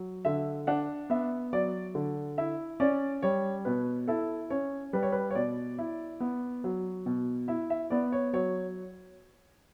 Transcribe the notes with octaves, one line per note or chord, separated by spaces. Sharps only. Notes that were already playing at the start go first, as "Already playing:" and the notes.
Already playing: F#3
D3 E5
D4 F#5
B3 E5
F#3 D5
D3
E4 E5
C#4 D5
G3 C#5
B2 B4
E4 A4
C#4 C#5
G3 B4
C#5
B4
C#5
B2 D5
E4
B3
F#3
B2
E4 E5
E5
B3 D5
C#5
F#3 C#5